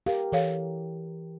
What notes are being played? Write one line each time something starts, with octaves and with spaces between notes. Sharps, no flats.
G4 A#4 F5
E3 A4 C#5 F5